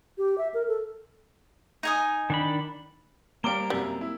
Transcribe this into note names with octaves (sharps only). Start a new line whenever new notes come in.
G4
E5
A#4
A4
D#4 G#5 D#6
D#3 D4 B5
G3 A#3 C4 F5 A#5 D6 D7 G7
F#2 C3 G3
E4